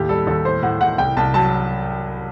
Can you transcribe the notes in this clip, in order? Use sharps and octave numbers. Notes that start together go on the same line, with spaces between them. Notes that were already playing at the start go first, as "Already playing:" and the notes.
Already playing: D#2 A2 G4
G3 A4
D#2 A4
A2 C5
A2 F#5
A2 F#5
C2 G5
C2 A5
F#3 A5